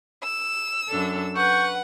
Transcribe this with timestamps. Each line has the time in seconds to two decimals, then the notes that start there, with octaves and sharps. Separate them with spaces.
0.23 E6
0.88 F#2 D4 A4
1.36 B4 F#5 C#6 G6